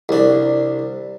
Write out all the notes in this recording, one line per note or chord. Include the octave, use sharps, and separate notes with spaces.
C2 D4